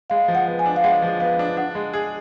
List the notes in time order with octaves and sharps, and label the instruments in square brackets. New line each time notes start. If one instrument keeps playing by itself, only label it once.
[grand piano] G#3 [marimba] F5
[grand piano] F3
[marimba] F#5
[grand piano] B3
[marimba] G#5
[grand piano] D4
[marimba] F5
[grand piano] G#3 [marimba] F#5
[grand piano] F3
[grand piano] B3 [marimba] F5
[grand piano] D4
[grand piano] D4 [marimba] F#5
[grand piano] G#3
G#4